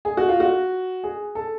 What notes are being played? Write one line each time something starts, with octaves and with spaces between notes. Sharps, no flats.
G#4
F#4
F4
F#4
G#4
A4